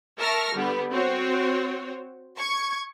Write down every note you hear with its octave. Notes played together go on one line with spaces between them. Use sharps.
A#4 E5 A5 C#6 F6 A#6
D3 G3 B3
C4 F#4 C5 C#5
C#6 G#6